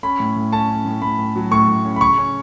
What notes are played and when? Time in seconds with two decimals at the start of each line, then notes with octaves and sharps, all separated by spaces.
0.03 C#4 B5
0.20 A2
0.36 A2
0.52 C#4 A5
0.70 C#4
0.85 A2
1.02 A2 B5
1.19 A2
1.36 F#3
1.51 A2 C#6
1.68 A2
1.85 C#4
1.96 B5
2.01 C#3 C#6
2.18 C#4